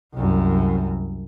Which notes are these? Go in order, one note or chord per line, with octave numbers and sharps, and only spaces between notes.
C2 F#2